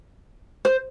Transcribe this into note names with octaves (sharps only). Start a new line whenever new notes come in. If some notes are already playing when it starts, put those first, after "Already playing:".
C5